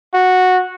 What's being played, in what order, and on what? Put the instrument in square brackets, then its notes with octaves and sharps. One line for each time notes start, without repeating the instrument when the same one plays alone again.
[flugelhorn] F#4